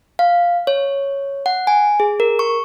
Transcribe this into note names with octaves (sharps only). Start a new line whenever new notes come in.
F5
C#5
F#5
G#5
G#4
A#4
C#6